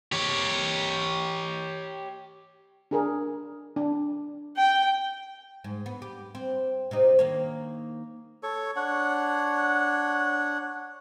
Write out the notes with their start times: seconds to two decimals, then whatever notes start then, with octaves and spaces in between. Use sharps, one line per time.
0.12 G4 C#5
2.91 D4 G#4 A#4
3.76 D4
4.57 G5
5.64 G#2
5.86 B3
6.02 G4
6.35 C4
6.91 C3 C4 D#4
7.19 D#3 A#3 C#5
8.43 A4 C#5 C#6
8.76 D4 C#5 F#5